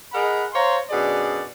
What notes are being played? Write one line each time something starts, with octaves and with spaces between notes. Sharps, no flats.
G#4 A#4 D#5 F#5 B5
C5 C#5 F5 A#5 C6
F#2 B2 D4 G#4 D5